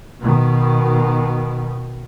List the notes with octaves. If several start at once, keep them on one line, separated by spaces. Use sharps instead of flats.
B2 D#3